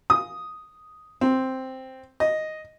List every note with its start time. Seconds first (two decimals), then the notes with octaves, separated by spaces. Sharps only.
0.10 D#6
1.21 C4
2.20 D#5